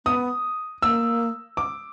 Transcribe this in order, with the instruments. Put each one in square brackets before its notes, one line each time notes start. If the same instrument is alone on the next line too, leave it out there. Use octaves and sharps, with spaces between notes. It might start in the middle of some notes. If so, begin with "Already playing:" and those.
[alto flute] B3 [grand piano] D#6
[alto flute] A#3 [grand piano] E6
[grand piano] D6